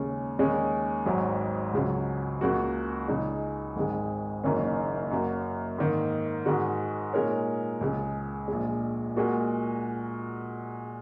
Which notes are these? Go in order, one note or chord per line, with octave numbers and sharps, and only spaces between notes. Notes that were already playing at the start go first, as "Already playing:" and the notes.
Already playing: D#2 C#3 G#3 C#4
D#2 D#3 G#3 C#4
G#1 G#2 F#3
C#2 C#3 F#3
C#2 C#3 A#3 F#4
C#2 C#3 G#3 D#4
G#1 G#2 D#3 G#3
F#1 F#2 D#3 A#3 C#4
F#2 F#3 A#3
G#2 D#3 A#3
G#2 D#3 G#3 F#4
A#2 G#3 D#4 A#4 C#5
C#2 C#3 G#3
A#1 A#2 G#3
A#2 G#3 F#4 A#4